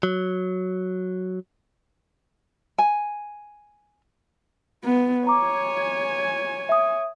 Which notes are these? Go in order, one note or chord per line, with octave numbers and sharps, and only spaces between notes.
F#3
G#5
B3
C#5 G#5 A#5 D6
E5 D#6